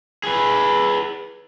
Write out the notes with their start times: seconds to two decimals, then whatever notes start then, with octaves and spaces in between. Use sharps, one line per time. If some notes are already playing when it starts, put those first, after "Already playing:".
0.23 G#4 B4